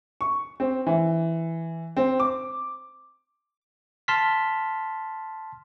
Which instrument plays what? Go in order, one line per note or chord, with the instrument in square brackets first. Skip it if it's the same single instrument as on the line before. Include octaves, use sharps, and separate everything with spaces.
[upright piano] C#6
C4
E3
C4
D6
[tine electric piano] A5 C6 F6 B6